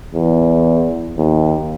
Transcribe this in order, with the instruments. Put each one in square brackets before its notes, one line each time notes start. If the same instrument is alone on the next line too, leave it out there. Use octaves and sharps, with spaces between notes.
[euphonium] E2
D#2